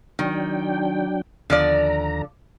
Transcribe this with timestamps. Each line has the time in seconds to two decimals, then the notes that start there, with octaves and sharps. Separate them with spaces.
0.19 D#3 F#3 D4 G5
1.50 D#2 D3 F3 D5 A#5